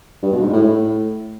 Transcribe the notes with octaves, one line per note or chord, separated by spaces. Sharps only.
G2
B2
G#2
A2
A2